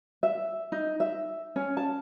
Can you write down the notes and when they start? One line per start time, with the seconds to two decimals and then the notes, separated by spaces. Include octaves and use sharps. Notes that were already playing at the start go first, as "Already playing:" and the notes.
0.23 E5
0.72 D#4
1.00 E5
1.56 C#4
1.77 A5